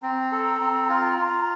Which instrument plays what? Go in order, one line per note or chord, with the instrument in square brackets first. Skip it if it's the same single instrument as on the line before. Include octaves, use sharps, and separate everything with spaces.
[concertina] C4 [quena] A#5
[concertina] A4
C4
F4
F4